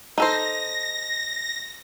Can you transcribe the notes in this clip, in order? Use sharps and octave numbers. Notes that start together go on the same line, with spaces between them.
D#4 A4 C5 A#6